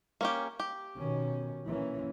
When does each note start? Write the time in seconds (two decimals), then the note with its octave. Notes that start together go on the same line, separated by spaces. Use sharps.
0.21 A#3 C#4 G4
0.60 G4
0.97 B2 D#3 C#4
1.67 E3 A#3 C#4